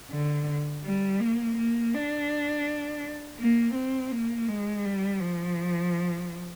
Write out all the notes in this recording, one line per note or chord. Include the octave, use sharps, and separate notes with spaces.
D3
G3
A#3
A#3
D4
A#3
C4
A#3
G#3
G3
F3